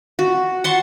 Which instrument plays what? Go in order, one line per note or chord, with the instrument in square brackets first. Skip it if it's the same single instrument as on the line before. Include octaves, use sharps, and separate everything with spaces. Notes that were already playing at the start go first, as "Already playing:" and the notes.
[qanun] F#4
[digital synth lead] F#5 [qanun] A5 C6 C#6